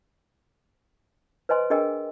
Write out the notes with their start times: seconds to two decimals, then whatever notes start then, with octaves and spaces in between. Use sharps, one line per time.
1.49 B4 C5 D#5 G#5 C6
1.70 D4 G#4 A#4 D#5 G5 G#5